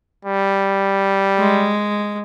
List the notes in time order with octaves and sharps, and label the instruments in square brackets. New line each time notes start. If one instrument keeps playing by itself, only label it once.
[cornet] G3
[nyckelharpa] G#3